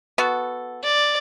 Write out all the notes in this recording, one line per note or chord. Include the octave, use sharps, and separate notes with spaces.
B3 F#4 A4
D5